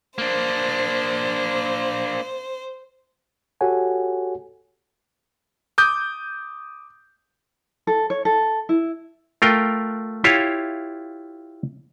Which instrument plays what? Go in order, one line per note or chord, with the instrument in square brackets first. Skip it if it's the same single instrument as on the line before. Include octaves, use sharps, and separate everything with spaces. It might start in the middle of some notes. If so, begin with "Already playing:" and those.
[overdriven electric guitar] A#3 D4 [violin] C5
[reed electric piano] F#4 G4 A4 C#5 F#5 G#5
[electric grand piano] D6 D#6 G6
[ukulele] A4
C#5
A4
E4
[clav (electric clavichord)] A3 F4 A#4 G5
E4 F4 G4 C#5 E5 F5